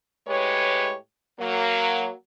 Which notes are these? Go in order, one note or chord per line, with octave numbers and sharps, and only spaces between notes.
A2 G#3 G4 B4 C#5
F#3 A#3